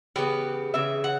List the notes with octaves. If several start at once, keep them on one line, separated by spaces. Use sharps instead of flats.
C#3 E3 B3 G4 B4
C#3 E3 E5
F#5